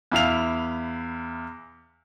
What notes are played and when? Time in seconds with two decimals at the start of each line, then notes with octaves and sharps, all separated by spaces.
0.12 E2 E4 F5 F7